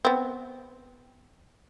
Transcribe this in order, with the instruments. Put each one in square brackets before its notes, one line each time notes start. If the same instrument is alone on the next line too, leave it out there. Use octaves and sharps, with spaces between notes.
[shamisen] B3 C4